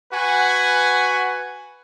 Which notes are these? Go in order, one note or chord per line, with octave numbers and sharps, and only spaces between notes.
F#4 B4 F#5 G#5